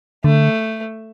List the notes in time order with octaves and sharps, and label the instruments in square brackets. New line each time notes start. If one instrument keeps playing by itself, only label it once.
[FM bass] D3 [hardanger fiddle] A3